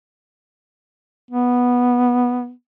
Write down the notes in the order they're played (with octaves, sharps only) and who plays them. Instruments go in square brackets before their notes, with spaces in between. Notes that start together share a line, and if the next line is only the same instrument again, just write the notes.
[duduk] B3